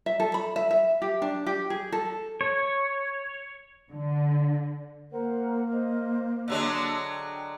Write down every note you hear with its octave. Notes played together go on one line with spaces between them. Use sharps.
E5
A4
B5
E5
E5
G4
D4
G4
G#4
A4
C#5
D3
A#3 A#4 C5 F#5
C5 D#5
D3 F#3 G#3 D4 C#5 E6
G5